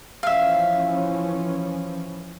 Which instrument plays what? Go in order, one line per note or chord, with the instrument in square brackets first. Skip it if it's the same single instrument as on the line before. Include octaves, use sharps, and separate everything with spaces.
[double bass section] E3 F3 C#4 [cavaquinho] E5 F5